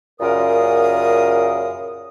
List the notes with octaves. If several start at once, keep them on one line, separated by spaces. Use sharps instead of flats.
F#2 A#2 C#3 A#4 D#6